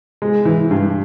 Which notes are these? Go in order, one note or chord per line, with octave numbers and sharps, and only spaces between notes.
G#3
E3
G2